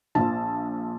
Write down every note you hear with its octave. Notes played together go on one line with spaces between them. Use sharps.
A#1 A#2 F3 A5